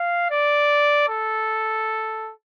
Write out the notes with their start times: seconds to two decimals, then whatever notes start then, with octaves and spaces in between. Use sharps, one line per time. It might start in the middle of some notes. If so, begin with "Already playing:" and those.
Already playing: F5
0.30 D5
1.09 A4